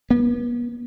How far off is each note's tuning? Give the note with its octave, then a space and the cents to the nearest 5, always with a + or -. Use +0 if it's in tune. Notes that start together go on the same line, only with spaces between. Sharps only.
B3 -40